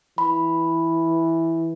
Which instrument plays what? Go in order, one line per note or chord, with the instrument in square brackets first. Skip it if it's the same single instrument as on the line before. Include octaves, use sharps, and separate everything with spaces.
[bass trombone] E3 [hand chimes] B5